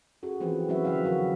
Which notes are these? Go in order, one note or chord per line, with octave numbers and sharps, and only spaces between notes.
C#4 F#4 G#4 A4
E3 F3 C4 F4 G#4 B4
F#3 C4 C#4 F#4 B4 E5
D3 D#3 F3 F#3 E5 F5
F#3 F#4 A#4